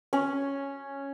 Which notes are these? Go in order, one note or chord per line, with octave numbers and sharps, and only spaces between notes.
C#4